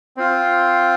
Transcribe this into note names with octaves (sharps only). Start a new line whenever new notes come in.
C4 F4